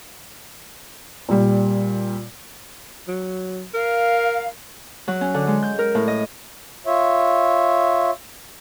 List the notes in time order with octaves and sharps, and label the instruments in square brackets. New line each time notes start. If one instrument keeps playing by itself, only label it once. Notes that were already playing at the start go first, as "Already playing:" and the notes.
[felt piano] A#2 G3
[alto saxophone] F#3
[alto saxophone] A#4 [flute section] F5
[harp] F#3
C#4
D3
G#3
G6
A#4
A2
D#5
[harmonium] F4 C#5 E5